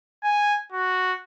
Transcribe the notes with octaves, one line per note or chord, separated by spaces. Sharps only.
G#5
F#4